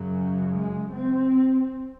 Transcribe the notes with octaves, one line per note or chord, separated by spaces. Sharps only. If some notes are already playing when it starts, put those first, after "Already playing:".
Already playing: F#2 C#3 F#3
G#3
C4